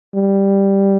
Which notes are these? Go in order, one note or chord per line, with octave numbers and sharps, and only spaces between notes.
G3